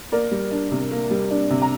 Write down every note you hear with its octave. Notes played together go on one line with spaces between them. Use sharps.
A#3 A#4 D5
G3
D4
C3
A#3
G3
D4
C3
A#5